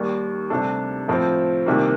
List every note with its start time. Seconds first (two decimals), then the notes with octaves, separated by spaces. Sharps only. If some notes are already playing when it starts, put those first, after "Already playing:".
Already playing: D#2 D#3 G3
0.50 D2 C3 G3 D4 A4
1.08 A2 F3 C4 F4 A4
1.66 C2 C3 D#3 A#3